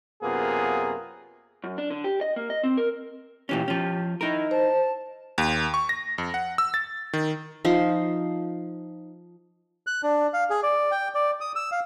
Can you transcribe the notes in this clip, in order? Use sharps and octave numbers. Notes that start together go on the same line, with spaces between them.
F#2 C3 A#3 B3 F4 G#4
F#2
D4
D3
G4
D#5
A#3
D#5
C4
A#4
A#2 E3 C#4 G4
F3 C#4
D#4 E4 A#4
C5 A5
D#2
C#6
A#6
F2
F#5
E6
A6
D#3
F3 D#4 C5
F#6
D4
F5
G#4
D5
G5
D5
D#6
E6
F5